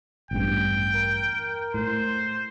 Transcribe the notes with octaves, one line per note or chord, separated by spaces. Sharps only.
A1 E2 G2 G5
A#4
A2 C5